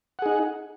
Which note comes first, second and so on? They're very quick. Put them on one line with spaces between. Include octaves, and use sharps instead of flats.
F#5 G#4 D#4